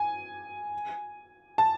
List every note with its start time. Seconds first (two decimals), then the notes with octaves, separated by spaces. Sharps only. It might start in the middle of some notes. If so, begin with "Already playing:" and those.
Already playing: G#5
1.58 A5